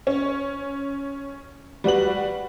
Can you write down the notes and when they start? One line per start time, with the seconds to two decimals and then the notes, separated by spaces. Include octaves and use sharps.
0.07 C#4
1.84 G3 F#4 B4 F#7